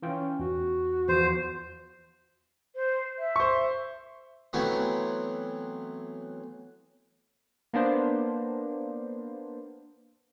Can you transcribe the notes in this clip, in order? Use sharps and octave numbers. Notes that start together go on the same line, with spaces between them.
E3 C#4 F4 G5
E2 F#4
E2 F3 C5
C5
E5
C5 C#6
E3 F#3 A3 B3 C4
A#3 B3 D4 C5